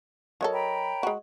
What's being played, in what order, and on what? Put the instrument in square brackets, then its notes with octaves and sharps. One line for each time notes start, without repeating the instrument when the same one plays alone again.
[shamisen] F#3 F#4 A4 [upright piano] A#4 C#5 D#5
[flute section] G5 A#5 B5
[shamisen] G#3 F#4